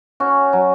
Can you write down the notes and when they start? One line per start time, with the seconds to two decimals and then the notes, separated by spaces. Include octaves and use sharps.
0.20 C#4 F#4
0.53 F#3